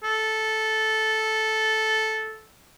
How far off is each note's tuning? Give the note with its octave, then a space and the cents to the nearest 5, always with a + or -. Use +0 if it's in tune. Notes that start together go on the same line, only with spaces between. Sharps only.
A4 -5